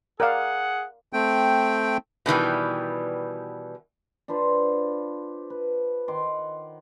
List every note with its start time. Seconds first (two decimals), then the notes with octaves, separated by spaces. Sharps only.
0.20 G#4 A#4 D5 F5 F#5
1.13 A3 C4 G5
2.26 B2 D#3 E3 G3
4.28 D4 F4 B4 C5
5.50 B4
6.08 D#3 F#5 C6 D6